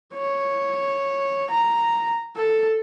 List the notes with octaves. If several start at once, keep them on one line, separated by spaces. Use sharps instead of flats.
C#5
A#5
A4